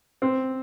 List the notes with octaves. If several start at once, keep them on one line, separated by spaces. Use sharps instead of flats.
C4